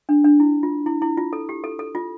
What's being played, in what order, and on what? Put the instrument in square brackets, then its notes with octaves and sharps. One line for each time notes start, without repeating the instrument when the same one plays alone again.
[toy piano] D4
D4
E4
F4
E4
E4
F4
A4
G4
A4
A4
F4